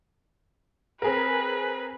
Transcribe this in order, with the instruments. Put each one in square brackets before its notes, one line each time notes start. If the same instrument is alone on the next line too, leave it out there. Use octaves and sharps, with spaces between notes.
[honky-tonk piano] C4 G#4 A#4 [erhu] B4